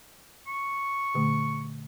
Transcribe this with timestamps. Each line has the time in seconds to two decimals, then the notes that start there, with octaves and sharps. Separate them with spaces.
0.47 C#6
1.14 A#2 D3 A3